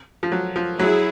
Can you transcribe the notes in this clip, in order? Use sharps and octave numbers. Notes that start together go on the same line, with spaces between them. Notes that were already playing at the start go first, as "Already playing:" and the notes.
F3
F#3
F3
F#3 E4 G#4